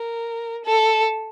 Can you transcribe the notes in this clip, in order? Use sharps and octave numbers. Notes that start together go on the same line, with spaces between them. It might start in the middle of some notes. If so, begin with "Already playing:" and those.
Already playing: A#4
A4